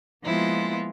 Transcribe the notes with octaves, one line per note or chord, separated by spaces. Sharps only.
F3 G#3 A#3 B3 E4 F4